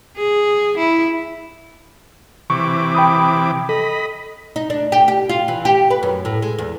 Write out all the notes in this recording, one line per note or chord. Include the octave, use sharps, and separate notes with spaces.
G#4
E4
C3 E3 C#6 D6
G5 B5 D#6
A4 D#5 B5
D#4
D4
G4
G4
F4
E3
G4
B4
F#2
A2
G#3
E2